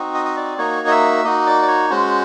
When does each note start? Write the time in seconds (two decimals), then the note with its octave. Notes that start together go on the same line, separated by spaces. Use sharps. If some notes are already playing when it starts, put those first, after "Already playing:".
Already playing: C4 D#4 F#4
0.14 D#5
0.25 D#5
0.37 D5
0.58 A#3 D#4 F#4 C#5
0.87 D#5
0.91 E5
1.24 A#3 D#4 F#4 D#5
1.46 D5
1.62 D5
1.68 C#5
1.90 G#3 C#4 F#4 C5